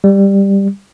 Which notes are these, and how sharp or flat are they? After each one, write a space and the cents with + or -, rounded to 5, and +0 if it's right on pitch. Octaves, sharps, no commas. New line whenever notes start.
G3 +10